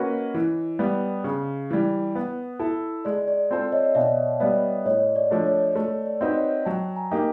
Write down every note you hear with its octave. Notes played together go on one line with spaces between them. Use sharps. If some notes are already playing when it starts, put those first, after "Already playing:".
Already playing: A#3 C#4 F#4 B4 C#5 D#5
E3
G3 B3
C#3
E3 G3
B3
E4 A4
G#3 D5
D5
C4 F4 A4 C5
C#5 D#5
B2 D5 E5
G3 B3 D5 E5
A2 C#5 D#5
D5
F3 A3 D4
C#5
A3 C#5
D5
C4 D#4 F#4 B4
C#5 D#5
F#3 G5 A5
G#5 A#5
A#3 D#4 G4